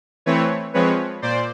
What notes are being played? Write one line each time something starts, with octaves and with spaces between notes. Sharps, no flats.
E3 A3 C4 B4 C#5
F3 G#3 C4 B4 C#5
A#2 C5 D5